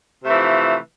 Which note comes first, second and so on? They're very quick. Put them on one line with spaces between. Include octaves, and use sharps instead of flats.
C3 A3 E3 F3